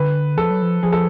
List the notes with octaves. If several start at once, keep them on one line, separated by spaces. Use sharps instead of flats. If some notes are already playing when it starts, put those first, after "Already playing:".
Already playing: D3 B4
F3 A4
F#3
F3
F3 G#4
A4